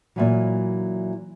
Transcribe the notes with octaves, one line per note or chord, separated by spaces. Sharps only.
A#2 E3 F#3